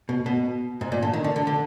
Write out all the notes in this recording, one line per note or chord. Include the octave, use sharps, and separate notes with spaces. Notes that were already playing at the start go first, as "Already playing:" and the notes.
B2
B2
G#2
A#2
D3
D#3
D3
D3
D3